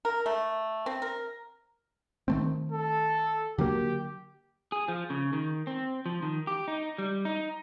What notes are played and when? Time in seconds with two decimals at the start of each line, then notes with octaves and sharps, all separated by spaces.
0.05 A#4
0.26 A3
0.86 C4
1.02 A#4
2.28 D#3 A3 C4
2.72 A4
3.58 D3 F#3 A#3 G4
4.72 G#4
4.88 F3
5.10 C#3
5.33 D#3
5.67 C4
6.06 F3
6.22 D#3
6.47 G4
6.68 D#4
6.98 G3
7.25 D#4